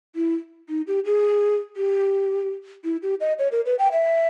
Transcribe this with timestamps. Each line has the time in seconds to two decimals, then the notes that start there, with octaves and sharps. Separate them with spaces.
0.15 E4
0.69 D#4
0.87 G4
1.06 G#4
1.77 G4
2.84 E4
3.02 G4
3.21 D#5
3.39 C#5
3.52 A#4
3.66 B4
3.79 G5
3.92 E5